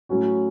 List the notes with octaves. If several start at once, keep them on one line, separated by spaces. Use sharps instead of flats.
A2 F#3 C#4 F#4